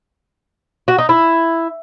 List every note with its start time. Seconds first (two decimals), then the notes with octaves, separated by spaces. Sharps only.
0.88 F#4
0.98 D#4
1.09 E4